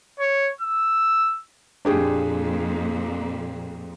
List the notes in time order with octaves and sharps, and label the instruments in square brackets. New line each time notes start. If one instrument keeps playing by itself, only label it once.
[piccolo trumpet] C#5
E6
[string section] F2 A#2 [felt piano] D4 G4 G#4